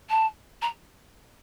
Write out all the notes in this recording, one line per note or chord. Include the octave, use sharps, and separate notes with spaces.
A5
A#5